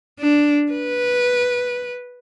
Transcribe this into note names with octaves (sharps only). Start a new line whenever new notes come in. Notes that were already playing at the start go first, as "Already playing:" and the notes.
D4
B4